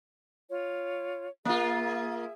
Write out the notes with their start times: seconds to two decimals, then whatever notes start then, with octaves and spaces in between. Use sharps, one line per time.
0.49 F4 C#5
1.45 A#3 F4 G#4 E5